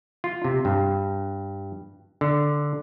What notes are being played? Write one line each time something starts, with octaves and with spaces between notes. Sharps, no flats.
F4
C3
G2
D3